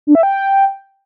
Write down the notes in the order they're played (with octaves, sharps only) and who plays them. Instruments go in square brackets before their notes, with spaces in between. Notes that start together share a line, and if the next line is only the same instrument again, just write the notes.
[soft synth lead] D4
E5
G5